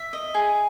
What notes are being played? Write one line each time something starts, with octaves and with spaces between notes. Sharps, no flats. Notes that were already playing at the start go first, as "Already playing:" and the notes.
Already playing: E5
D#5
G#4